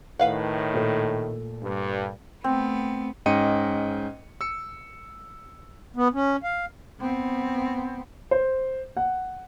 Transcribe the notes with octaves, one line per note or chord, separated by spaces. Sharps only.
A2 D#3 B4 F5 F#5
A#2 A3 A4
G2
A3 B3 C4
G#2 C#4 D#5 G5 C#7 D#7
E6 C#7
B3
C#4
F5
B3 C4
C5
F#5